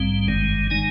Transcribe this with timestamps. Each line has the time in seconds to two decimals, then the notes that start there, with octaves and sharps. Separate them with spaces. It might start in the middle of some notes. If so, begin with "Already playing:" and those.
Already playing: A#1 G#2 G3 C4
0.28 G1 G2 D#3 G#3
0.70 D#3 G#3 D#4 G#5